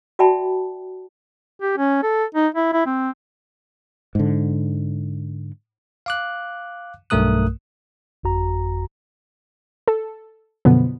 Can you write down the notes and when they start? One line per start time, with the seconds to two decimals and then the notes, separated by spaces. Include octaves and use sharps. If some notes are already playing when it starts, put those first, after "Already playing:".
0.19 F#4 D5 E5 G5 A5 B5
1.60 G4
1.77 C#4
2.03 A4
2.35 D#4
2.54 E4
2.73 E4
2.86 C4
4.15 G#2 D3
6.06 F5 D6 F#6
7.10 B1 G2 A3 A#4 D#6 F#6
8.23 G1 F2 F#4 A#5
9.88 A4
10.65 F#2 B2 D3 F3 B3